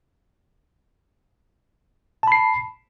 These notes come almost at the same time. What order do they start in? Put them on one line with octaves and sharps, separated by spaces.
A5 B5 C7